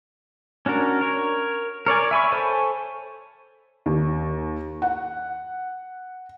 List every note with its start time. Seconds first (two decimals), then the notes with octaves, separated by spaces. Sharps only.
0.66 C#4 D4 F#4 A#4
1.01 A#4 C#5
1.86 A#4 C#5 D5 G#5
2.11 E5 G#5 B5 C#6
2.32 A4 C5 C#5 G#5
3.86 D#2
4.82 F#5